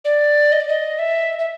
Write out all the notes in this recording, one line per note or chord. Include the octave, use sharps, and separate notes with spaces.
D5
D#5
D5
D#5
E5
E5